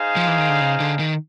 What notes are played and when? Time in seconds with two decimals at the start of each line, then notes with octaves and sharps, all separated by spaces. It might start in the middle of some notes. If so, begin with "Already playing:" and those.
Already playing: D#4 G#4 C5 F5
0.16 F3
0.28 E3
0.38 D#3
0.49 D3
0.61 C#3
0.80 D3
1.00 D#3